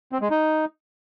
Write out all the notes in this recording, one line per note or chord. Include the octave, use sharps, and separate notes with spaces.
C4
G#3
D#4